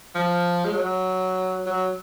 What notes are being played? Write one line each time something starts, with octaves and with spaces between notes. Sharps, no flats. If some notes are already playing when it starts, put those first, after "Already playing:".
F3
G#3
F#3
F#3